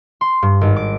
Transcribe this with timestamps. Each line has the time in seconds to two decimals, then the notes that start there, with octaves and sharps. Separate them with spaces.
0.21 C6
0.42 G2
0.61 G#1
0.76 D6